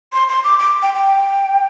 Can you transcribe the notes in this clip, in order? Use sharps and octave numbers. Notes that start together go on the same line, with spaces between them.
C6
C6
D6
D6
G5
G5